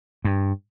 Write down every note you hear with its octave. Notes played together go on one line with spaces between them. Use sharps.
G2